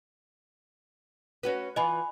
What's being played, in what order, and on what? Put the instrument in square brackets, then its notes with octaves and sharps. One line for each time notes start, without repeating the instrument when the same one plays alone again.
[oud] C#4 F#4 B4
[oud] E3 F4 [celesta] D#5 G#5 B5